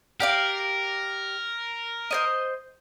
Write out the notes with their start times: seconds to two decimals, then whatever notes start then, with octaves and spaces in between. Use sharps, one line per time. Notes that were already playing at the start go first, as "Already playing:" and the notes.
0.20 G4 A#4 D5 F5
2.11 C5 C#5 D#5